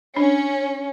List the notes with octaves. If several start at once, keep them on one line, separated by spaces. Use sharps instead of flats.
C#4 D4